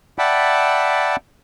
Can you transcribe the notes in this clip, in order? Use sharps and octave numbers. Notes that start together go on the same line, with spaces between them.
D5 E5 F#5 G5 A5 B5